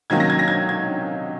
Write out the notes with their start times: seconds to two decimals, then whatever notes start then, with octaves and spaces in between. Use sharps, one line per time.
0.10 C3 D#3 F#3 A#3 C#4 G#6
0.20 A#6
0.30 G#6
0.39 A#6
0.48 G#6
0.69 G#6